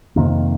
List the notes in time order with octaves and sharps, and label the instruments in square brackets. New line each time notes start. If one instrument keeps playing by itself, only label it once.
[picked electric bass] F2 C3 D#3 A#3